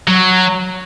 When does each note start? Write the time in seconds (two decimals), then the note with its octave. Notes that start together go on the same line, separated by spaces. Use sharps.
0.08 F#3